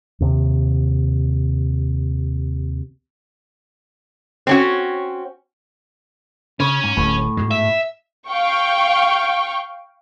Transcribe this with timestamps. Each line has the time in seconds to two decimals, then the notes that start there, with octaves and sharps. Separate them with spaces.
0.20 D#2 C3
4.47 C4 C#4 F#4
6.60 C#3 C#4
6.84 G#2
6.97 D1 A2
7.37 G#2 B2 G#3
7.51 E5
8.30 F5 G5 C#6